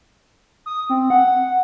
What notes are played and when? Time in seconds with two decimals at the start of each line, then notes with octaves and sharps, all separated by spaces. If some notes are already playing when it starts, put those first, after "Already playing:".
0.66 D#6
0.90 C4
1.10 F#5